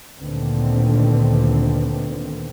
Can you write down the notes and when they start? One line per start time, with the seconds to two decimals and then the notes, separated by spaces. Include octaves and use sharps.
0.20 D2 A#2 D3 D#3 B3 C4